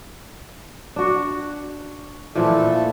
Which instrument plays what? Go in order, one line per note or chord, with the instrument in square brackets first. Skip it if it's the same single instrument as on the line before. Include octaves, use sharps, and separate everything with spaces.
[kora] D4 F#4
[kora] A#2 E3 F3 [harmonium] A3 A4